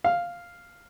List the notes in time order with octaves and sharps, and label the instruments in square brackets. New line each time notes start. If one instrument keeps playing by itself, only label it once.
[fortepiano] F5